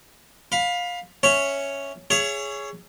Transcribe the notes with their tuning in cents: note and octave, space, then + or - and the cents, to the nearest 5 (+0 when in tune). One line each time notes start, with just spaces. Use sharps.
F5 +20 B5 +0
C#4 +0 C#5 +0 E5 +0
G#4 +0 C#5 +10 E5 +45